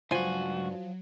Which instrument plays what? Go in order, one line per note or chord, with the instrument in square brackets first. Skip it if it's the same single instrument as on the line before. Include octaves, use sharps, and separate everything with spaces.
[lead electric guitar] C#2 F#4 [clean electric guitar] G2 G#5 [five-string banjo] F3 [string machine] F#3